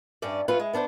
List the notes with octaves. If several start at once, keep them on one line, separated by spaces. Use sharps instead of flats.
G2 C#4 D5
F#3 C#4 F4 B4
G#3
B3 D4 A#4 C5